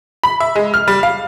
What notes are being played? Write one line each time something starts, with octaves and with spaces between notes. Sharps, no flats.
B5
E5
G#3
F6
G3
F5